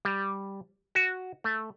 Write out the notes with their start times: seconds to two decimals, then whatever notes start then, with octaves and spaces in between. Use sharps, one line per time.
0.05 G3
0.95 F#4
1.44 A3